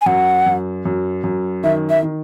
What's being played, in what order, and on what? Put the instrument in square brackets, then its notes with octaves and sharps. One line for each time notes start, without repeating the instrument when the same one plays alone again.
[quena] G#5
[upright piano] F#2 [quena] F#5
[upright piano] F#2
F#2
F#2
[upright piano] D#3 [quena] E5
[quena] E5
[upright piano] D#3